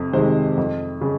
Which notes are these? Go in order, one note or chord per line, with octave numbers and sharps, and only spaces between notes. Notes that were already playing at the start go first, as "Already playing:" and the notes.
Already playing: F2 C3
C3 D#3 G#3 C5
F2
C#3